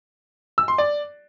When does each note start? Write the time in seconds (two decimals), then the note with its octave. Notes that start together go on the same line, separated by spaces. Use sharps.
0.58 E6
0.68 C6
0.78 D5